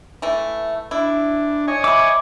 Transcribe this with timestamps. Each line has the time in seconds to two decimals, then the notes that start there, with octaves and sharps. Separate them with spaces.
0.22 E3 A3
0.91 D4 E4
1.68 C#5 D#5 G#5
1.84 E5 B5 D6